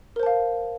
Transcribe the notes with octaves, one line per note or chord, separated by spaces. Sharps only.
A#4 C5 F5 A5